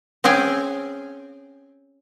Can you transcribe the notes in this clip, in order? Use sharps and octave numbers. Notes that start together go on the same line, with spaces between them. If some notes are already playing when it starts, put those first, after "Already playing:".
C4 C#4 G#4 G5 G#5